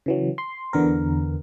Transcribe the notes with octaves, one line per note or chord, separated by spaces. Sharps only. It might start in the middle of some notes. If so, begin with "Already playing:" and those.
C#3 E3 F#3
C6
E2 D3 B3 A#4